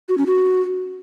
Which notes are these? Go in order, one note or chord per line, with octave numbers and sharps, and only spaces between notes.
F#4
C#4
F#4